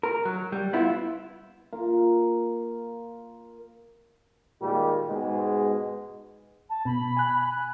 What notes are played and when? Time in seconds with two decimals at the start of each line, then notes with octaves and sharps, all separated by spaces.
0.03 A#4
0.25 F#3
0.52 G3
0.73 B3 E4 F4
1.73 A#3 F4 A#4
4.62 A#2 D#3 G3 G#3 G4
5.09 G#2 B2 G#3
6.69 A5
6.85 B2 B5
7.17 G#5 F#6